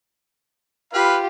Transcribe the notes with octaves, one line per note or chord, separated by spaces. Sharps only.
F4 G4 B4 F5 B5